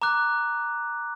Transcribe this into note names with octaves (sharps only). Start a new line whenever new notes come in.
A#5 D6 F#6